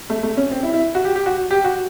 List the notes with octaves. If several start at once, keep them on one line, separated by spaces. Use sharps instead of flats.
A3
A3
C#4
C4
E4
E4
F#4
G4
G4
F#4
G4
F#4